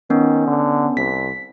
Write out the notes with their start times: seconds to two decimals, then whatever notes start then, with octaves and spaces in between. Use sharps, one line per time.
0.10 D#3 B3 C#4
0.47 D3
0.97 C2 B6